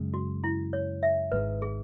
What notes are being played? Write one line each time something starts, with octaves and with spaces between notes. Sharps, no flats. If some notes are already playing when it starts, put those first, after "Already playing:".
Already playing: F#2 C#3 G#3
F#4
E4
C#5
E5
G#1 G#2 G#3 B4
G#4